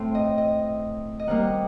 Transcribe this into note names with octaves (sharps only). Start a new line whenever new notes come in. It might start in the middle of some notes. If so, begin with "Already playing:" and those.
Already playing: A2 A3 C4
D#5
D#5
D#5
C3 D#3 G3 A#3 F#5